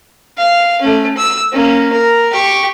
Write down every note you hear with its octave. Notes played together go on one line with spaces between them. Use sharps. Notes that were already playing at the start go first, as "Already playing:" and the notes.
F5
A3 C#4
E6
A#3 C#4
A#4
G4 C#6